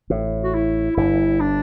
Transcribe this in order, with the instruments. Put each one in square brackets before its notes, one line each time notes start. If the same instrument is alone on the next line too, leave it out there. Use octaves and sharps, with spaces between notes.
[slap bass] A1 A2
[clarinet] F#4
E4
[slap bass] G1 G2 [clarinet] E4
[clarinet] D4